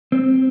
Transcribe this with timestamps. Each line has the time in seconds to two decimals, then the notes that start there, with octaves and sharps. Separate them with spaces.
0.12 C4